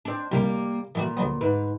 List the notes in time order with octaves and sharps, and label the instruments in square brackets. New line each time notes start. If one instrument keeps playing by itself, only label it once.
[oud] C4 D4
[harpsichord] C2 [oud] G3 A#3
[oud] A#2 [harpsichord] E3 A3 F#4
[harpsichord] D2 F#3 B3
[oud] G#2 B4